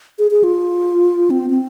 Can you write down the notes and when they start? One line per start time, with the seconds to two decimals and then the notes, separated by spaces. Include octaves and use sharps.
0.19 G#4
0.31 G#4
0.44 F4
1.30 C4
1.50 C4